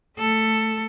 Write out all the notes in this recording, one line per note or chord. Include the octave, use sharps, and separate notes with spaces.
A3 A4